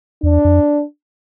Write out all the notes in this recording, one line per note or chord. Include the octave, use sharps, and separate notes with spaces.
E2 D4
F2